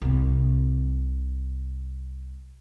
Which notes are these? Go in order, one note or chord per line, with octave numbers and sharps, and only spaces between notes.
C2 C3